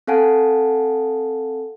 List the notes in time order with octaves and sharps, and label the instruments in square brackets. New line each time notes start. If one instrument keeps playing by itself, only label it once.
[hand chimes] C4 A4 F5 F#5 G#5 A5